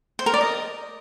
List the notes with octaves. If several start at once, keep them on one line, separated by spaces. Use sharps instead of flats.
C5
A#4
D5
D#5